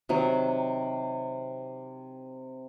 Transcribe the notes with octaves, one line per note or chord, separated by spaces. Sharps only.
C3 D#3 F#3